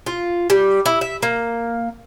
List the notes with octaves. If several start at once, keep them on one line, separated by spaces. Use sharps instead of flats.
F4
G3
E4
E5
A#3